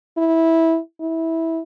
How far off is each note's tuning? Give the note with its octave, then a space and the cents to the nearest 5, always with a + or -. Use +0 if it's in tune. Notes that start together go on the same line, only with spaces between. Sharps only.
E4 -15
E4 -15